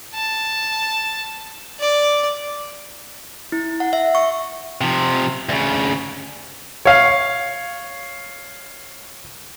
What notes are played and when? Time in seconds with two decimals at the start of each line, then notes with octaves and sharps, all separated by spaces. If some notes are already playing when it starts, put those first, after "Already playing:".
0.14 A5
1.79 D5
3.52 E4
3.80 F#5
3.93 E5
4.15 C#6
4.81 C3 F3
5.49 D2 C#3
6.85 C#5 F5